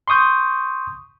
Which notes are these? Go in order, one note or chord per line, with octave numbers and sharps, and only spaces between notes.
C6 C#6 D#6 G6